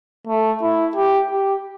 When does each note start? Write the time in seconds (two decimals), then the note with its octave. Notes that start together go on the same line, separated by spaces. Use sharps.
0.27 A3
0.62 E4
0.96 G4
1.31 G4